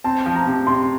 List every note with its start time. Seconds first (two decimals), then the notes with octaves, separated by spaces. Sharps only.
0.04 C4 A5
0.26 F3
0.36 A#5
0.47 C3
0.67 C3 C6